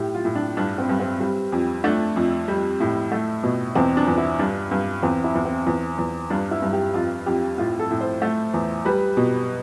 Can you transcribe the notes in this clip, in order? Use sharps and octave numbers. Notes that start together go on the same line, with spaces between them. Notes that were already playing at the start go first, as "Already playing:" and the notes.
Already playing: A2 G4
F4
A2
D4
G2 D4
C4
G2
C4
G3
F2
A3 D4
F2
G3
A2
A3
B2
E2 C4
D4
E2
E4
G2 D4
G2
E2 C4
E4
E2
C4
E2
E2
G2 D4
E4
G2
G4
F2 F4
F2 G4
A2 F4
A4
A2
C5
A3
E2
G3 B4
B2